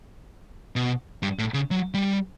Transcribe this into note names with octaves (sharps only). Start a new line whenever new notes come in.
B2
G2
A2
C#3
F#3
G3